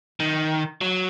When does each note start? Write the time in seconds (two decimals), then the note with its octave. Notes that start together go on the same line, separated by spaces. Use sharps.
0.20 D#3
0.81 F#3